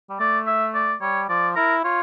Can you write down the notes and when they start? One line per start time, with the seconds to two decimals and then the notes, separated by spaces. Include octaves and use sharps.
0.09 G3
0.20 A3 D5
0.47 E5
0.74 D5
1.01 G3 C#5
1.29 F3 D5
1.56 E4 A#4
1.84 F4 C#5